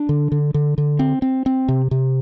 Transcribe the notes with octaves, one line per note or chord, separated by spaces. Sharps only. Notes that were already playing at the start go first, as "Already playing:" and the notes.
Already playing: D4
D3
D3
D3
D3
C4
C4
C4
C3
C3